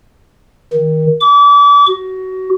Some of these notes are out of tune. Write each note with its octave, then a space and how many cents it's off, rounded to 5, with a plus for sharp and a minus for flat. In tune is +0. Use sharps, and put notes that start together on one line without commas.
D#3 +20
D6 -35
F#4 +25